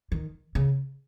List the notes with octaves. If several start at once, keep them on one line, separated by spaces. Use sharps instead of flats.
D#3
C#3